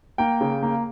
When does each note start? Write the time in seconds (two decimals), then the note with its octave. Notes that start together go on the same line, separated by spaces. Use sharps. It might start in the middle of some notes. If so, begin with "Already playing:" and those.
0.18 A#3 G5
0.41 C#3
0.63 A#3